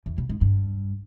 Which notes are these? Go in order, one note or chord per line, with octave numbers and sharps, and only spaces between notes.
E2
B2
G#2
G2